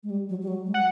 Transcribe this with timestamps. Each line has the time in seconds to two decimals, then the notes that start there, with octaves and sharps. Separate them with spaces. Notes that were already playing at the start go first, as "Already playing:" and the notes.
0.03 G#3
0.10 G3
0.29 F#3
0.42 G3
0.47 F#3
0.66 G#3
0.74 F#5